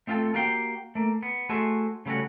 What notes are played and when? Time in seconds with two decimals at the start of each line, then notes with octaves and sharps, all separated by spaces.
0.07 A3 C4 F4 G4 A4
0.34 A#3 F#4 G4 F5 G5
0.95 A3 A#3
1.23 B3
1.49 A3 F#4 G#4 C5 E5
2.06 C#3 G3 A3 C#4 F#4